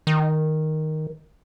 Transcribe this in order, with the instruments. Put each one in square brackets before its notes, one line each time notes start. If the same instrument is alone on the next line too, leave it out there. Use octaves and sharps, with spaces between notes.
[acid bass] D#3